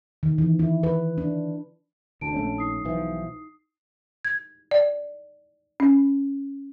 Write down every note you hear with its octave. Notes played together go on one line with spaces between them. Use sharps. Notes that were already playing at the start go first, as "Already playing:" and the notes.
D#3
E3
E4
B4
D4
D2 D3 D4 A5 D7
A#1 A3 C#4
D#4 D#6 C7
B1 E3 F3
G#6
D5
C#4